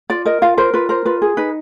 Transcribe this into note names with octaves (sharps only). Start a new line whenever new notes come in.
F4 D5
A#4 D#5
F4 F5
A#4 C5
F4 B4
A#4 C5
F4 B4
G#4
D#4 B4